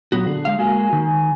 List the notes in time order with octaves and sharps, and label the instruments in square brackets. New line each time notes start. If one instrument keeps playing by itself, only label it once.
[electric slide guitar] A#2 B3 F#4 [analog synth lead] F#3
[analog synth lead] D3 [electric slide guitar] G#4
[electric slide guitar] G#3 F5
[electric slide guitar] G#3 A#3 F#4 [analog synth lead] G#5
[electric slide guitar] D#3